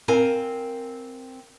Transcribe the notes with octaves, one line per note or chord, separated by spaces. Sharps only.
C4 A#4 F5 G#5